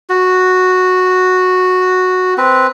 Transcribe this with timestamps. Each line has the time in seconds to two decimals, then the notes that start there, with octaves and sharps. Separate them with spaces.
0.10 F#4
2.38 C4 B4